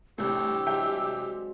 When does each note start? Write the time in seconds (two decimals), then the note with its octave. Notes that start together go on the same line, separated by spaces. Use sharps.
0.18 C2 A2 E3 C4 D4 G4 E6
0.66 C2 F#3 G#3 E5 G5